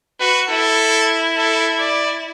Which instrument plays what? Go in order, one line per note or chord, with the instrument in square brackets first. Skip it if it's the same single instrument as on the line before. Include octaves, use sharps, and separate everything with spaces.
[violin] F#4 [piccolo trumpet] B4
[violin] E4 [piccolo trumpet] A4
[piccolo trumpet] A4
D5